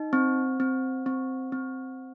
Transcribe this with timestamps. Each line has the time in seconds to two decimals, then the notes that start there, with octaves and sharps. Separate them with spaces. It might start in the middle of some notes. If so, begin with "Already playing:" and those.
Already playing: D#4
0.13 C4
0.60 C4
1.06 C4
1.52 C4